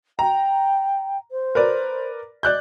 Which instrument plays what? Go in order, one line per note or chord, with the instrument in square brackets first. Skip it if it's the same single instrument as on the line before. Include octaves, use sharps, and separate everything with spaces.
[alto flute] G5 [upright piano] A#5
[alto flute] C5
[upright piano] A#4 B4 D5
[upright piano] D5 F#6 G6 [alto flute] D#5